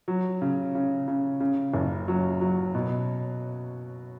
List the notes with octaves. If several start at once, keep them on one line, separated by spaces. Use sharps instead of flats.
F#3
C#3
C#3
C#3
C#3
F#1
F#3
F#3
B2